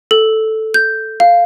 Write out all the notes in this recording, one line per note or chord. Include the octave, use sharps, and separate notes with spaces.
A4
G6
F5